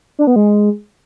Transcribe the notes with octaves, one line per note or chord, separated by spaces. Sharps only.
D4
B3
G#3